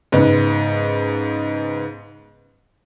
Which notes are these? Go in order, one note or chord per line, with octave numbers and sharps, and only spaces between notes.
G#2 C#3 B3